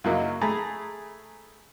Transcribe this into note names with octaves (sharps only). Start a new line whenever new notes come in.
F#2 C#3 F#3 A#3 D#4 E4
A3 G#4 A#5 B5